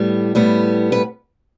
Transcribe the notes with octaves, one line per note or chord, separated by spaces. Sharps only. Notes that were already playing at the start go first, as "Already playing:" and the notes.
Already playing: A2 G3 B3
A2 G3 B3
B4